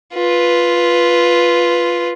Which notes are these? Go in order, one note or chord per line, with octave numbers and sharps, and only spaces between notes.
F4 B4